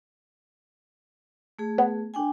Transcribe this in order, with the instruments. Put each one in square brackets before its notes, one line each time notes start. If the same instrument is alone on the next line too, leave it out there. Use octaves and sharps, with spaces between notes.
[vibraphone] A3 G#4
[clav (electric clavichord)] B3
[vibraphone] D4 G5 G#5